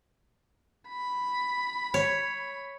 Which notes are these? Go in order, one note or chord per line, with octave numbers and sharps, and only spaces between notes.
B5
C#5